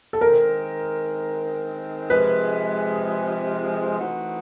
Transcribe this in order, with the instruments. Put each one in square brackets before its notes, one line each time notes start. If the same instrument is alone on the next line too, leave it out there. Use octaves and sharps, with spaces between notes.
[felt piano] A4
[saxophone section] D#3 G#3 C4 [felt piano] A#4
[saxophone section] C3 F3 G#3 [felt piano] B4
[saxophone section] E3 A3 C4 D#4 F#4